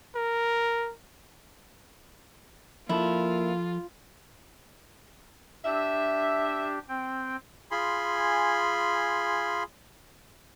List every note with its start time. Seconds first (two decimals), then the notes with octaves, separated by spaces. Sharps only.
0.15 A#4
2.89 F3 A#3 E4 F4 A4 A5
5.65 D4 G4 E5
6.89 C4 G5
7.71 F4 G#4 G#5 B5 C6